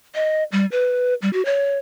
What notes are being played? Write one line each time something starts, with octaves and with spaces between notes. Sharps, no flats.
D#5
G3
B4
G3
F#4
C#5